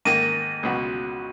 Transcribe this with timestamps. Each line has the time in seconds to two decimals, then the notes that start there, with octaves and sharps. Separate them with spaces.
0.05 G#2 D#3 A#3 D#7
0.63 C#2 B2 F#3